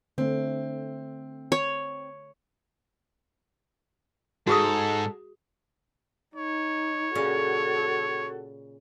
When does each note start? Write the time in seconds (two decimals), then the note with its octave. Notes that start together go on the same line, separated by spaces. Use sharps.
0.18 D3 A3 C4
1.52 C#5
4.47 G#2 F#4 G#4 A4 D#6
6.36 D#4 C#5
7.15 A#2 C#3 C#4 F#4 A4